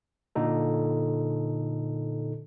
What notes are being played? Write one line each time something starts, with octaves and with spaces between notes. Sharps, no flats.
A#2 D3 D#4 A4